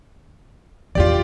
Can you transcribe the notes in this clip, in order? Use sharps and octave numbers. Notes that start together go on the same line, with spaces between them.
E2 G2 F4 G4 D5